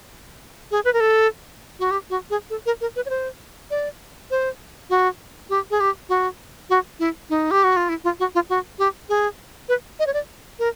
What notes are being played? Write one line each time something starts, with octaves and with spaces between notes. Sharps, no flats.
G#4
B4
A#4
A4
F#4
G4
F#4
G#4
A4
A#4
A#4
B4
C#5
C5
D5
C5
F#4
G4
G#4
G4
F#4
F#4
E4
D#4
G4
F#4
F4
E4
F4
F#4
F4
F#4
G4
G#4
B4
D#5
C#5
D5
A#4